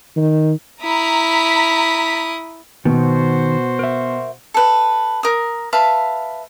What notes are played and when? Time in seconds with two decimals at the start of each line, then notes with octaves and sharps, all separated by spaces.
0.16 D#3
0.82 E4 A#5 B5 D#6 B6
2.85 B2 D#3 F#4 C5
3.79 A#4 E5
4.54 A4 B4
5.23 A#4 D#6
5.73 B4 E5 F5 A5